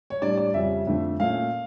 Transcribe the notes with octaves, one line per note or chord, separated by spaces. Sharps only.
C#5
A2 G3 D4 D5
D5
F2 C#3 G3 C#4 E5
F2 D3 A3
A#2 A3 C#4 F5